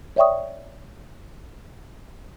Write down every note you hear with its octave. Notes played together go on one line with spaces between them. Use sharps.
C#5 D5 E5 G5 C#6 D#6